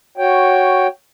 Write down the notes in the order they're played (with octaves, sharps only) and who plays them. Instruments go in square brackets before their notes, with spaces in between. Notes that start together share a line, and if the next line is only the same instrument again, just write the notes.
[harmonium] F#4 C#5 G5